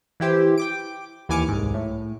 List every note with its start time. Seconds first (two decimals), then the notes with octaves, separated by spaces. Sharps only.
0.20 E3 E4 G4 C5
0.58 G5 D6 D7
1.29 D#2 E3 G#5 D6 F6 C#7
1.48 C2 G#2
1.74 A2